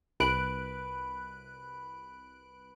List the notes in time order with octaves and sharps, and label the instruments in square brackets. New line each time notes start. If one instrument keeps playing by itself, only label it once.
[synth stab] C2 F#6 D7 [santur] B4